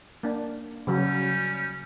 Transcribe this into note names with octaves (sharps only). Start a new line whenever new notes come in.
A#3 D4
C#3 F#3 G3 C#4